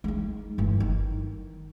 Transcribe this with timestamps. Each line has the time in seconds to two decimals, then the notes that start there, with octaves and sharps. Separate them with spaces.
0.04 G#3 D#4
0.58 G1 E3
0.80 D#3